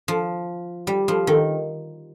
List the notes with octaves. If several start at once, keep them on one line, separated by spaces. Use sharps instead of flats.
F3
G3
F3
D#3